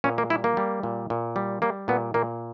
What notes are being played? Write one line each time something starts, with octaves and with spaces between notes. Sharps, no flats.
A#2 C#4
A#3
G3 E4
A#3
G3
A#2
A#2
G3
G3 A#3
A#2 B3
A#2 A#3